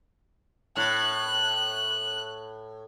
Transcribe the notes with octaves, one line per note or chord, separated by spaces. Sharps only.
A2 F#6